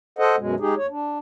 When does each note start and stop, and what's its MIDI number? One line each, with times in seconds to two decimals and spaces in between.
0.19 0.36 69
0.19 0.36 72
0.19 0.36 75
0.19 0.36 78
0.38 0.55 42
0.38 0.55 47
0.38 0.55 56
0.60 0.75 56
0.60 0.75 63
0.60 0.75 67
0.60 0.75 68
0.77 0.87 39
0.77 0.87 73
0.90 1.18 62